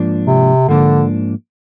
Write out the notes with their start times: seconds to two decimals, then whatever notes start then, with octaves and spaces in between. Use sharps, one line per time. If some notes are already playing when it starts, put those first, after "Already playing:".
Already playing: G#2 F3 A#3 D4
0.27 C3
0.68 G#2 D3 F3 A#3 D4